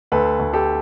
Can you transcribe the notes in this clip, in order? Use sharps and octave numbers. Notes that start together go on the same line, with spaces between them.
D2 A4 B4
D2
G4 A4